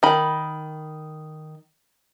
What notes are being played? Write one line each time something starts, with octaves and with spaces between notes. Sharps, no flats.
D#3 B5